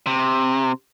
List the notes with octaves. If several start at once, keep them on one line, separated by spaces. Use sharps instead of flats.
C3